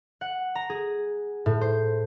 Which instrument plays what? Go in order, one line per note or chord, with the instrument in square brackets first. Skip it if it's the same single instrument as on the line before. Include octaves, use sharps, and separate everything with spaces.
[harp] F#5
A#5
G#4
A2
C5